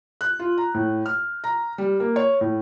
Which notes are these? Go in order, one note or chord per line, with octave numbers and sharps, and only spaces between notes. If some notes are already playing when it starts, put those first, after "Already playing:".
F#6
F4
A#5
A2
F6
A#5
G3
A#3
C#5
A2